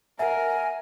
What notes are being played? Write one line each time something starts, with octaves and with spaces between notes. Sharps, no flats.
A#4 E5 F#5 G#5